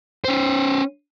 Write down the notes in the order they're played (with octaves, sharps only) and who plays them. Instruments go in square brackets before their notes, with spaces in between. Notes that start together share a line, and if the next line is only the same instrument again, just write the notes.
[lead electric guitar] C#4 C5